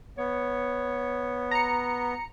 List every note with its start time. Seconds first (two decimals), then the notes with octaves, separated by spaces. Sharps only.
0.18 B3 C#5
1.51 A#5 C#7